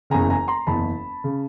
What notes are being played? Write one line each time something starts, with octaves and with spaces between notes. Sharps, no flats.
F#1 E2 C#3 G#5 A#5
G#5 A#5
A#5 C6
F#1 E2 C#3 A5 B5
C#3